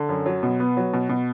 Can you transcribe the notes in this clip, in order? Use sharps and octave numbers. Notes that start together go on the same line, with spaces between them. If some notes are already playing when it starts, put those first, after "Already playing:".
Already playing: D3
F#2
F#3
B2
B3
F#3
B2
B2